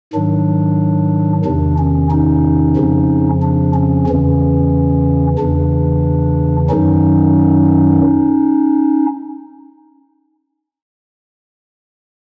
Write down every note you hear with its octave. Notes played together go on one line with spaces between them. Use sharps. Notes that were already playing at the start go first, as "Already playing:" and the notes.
G#2 D#3 F#3 D4
E2 C3 D#3 D4
C#4
C#4 D#4
F2 C#3 F3
D4
C#4
E2 C#3 E3 C#4
E2 C#3 E3 D4
F#2 D#3 F#3 C#4 D#4